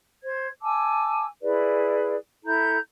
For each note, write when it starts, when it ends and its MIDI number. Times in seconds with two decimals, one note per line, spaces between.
0.23 0.47 72
0.23 0.47 92
0.61 1.25 80
0.61 1.25 81
0.61 1.25 86
0.61 1.25 88
1.41 2.16 64
1.41 2.16 68
1.41 2.16 71
1.41 2.16 74
2.44 2.76 64
2.44 2.76 69
2.44 2.76 82
2.44 2.76 91